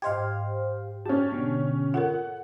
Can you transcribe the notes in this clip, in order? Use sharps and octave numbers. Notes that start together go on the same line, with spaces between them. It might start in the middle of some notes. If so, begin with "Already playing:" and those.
G#2 G4 C5 D#5 F5 G#6
C#4 G4 A5
B2 D3
F4 A4 A#4 F#5